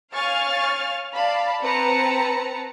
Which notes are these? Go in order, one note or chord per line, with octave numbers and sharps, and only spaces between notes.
C#5 F5 G#5 C#6 F6 A6
D5 F5 A5 B5
C4 B4 A5 A#5 C#7